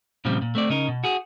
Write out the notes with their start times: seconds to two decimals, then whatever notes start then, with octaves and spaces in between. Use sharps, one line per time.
0.25 A#2 C#3 F3 G3 C4
0.42 A#2
0.55 A3 C4 D5
0.70 C#3 D#4 A#4
0.88 B2
1.04 F#4 G#4